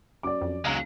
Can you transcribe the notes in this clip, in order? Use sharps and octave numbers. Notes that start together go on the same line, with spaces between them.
F#2 D5 D6
F2
E1 C#2 F#3 G#3 F5 A#5